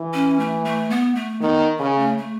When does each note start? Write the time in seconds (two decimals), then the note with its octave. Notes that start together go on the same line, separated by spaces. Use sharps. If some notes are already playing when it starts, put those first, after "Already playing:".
Already playing: E3
0.14 C#4
0.40 A3
0.65 A3
0.90 B3
1.15 A3
1.41 D#3 B3
1.79 C#3 C#4
1.98 A3
2.18 A3